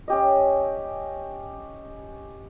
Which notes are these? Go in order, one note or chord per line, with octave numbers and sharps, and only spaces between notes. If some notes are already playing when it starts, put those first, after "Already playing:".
C#4 G4 D#5